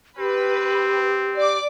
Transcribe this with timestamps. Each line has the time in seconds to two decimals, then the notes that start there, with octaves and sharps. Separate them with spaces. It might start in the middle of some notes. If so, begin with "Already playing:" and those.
0.18 C4 G4 B4
1.37 D5 D6